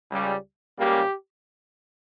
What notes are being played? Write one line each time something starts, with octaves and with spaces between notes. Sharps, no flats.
C#2 C#3 G3
C#2 C#3 G3 A#3 G4